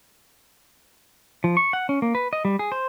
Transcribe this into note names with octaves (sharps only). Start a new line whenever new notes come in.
F3
C#6
F#5
C#4
A#3
B4
D#5
G3
G#4
C5